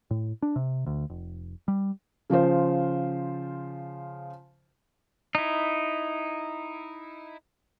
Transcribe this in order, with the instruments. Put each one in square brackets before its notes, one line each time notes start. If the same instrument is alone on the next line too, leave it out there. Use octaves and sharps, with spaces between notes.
[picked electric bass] A2
D4
C3
D2
F1
G3
[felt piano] C#3 F3 F4 C5
[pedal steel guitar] D#4 E4